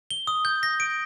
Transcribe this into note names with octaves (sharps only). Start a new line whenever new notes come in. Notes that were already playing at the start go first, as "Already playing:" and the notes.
G7
D#6
G6
A#6
D7